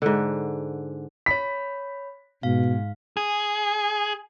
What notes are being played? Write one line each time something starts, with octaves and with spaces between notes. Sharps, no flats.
G#2 D3
C#5 B5 B6
G#2 B2 F5
G#4